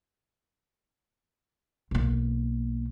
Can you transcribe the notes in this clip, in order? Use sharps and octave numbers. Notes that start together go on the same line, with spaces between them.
B1 A#3